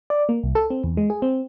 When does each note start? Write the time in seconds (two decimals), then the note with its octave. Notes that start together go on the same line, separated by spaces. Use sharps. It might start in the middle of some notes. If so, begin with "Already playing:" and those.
0.10 D5
0.29 A#3
0.43 C2
0.55 A4
0.70 C4
0.84 E2
0.97 G#3
1.10 G#4
1.22 C4